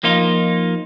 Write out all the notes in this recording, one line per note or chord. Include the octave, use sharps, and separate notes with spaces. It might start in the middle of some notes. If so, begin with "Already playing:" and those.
F3 A#3 D#4 F4